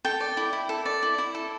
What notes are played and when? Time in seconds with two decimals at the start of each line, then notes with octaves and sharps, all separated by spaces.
0.05 A4 G5
0.20 D5
0.37 E4
0.53 E4
0.69 A4
0.86 D5
1.03 E4
1.18 E4
1.35 A4